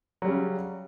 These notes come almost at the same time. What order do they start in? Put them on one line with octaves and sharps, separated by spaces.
F#3 G3 C#3